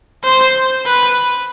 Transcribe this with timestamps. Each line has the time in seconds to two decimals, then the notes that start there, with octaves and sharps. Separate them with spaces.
0.24 C5
0.86 B4